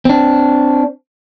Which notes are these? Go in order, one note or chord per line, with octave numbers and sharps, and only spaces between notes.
C4 D4